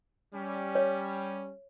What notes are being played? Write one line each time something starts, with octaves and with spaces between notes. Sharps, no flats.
G3 C#4
C#5